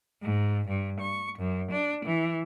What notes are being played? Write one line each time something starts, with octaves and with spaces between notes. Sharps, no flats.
G#2
G2
C#6
F#2
D4
E3